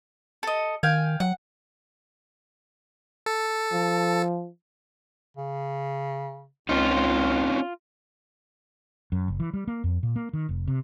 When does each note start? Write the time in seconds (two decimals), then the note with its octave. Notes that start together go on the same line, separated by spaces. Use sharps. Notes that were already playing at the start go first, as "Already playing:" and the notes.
0.43 A4 D#5
0.83 D#3 F5 G5 G#5
1.20 F#3 F#5
3.26 A4
3.72 F3
5.37 C#3
6.69 C#2 C4 C#4 D#4 F4
9.12 F#2
9.28 F#1
9.40 E3
9.54 G3
9.68 A#3
9.84 F2
10.03 A#2
10.16 A#3
10.33 D#3
10.49 F1
10.68 C3